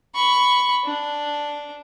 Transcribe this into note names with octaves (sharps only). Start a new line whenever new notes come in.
B5 C#6
D4